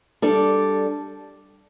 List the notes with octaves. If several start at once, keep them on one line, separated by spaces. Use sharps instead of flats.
G3 D4 A4 D5